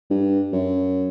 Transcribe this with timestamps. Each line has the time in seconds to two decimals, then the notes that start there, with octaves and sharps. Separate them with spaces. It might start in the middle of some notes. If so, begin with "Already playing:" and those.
0.10 G2
0.52 F#2